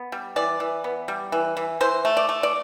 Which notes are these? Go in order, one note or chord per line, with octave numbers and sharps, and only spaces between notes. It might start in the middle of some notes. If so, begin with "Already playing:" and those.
Already playing: B3
G3
E3 D5
E3
B3
G3
E3
E3
E3 C5
A3
D5
A3
D5